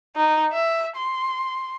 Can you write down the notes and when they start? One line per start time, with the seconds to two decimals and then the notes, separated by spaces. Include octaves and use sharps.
0.16 D#4
0.53 E5
0.96 C6